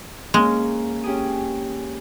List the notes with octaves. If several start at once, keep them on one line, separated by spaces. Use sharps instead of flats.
G#3 A#3 C#4
C#4 G4 G#4